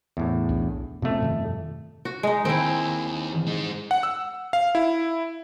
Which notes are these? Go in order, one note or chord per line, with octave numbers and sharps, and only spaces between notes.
E2 A2
B1 E3 D4
F2 B2 A3 B3 C#4
G2 B2 D#3
F#4
G#3 D#4
D#2 C4 E4
G#3 D#4
F#5
E6
F5
E4